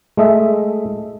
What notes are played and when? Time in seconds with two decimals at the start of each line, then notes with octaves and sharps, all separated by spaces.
0.17 G#3 A3 D#5 E5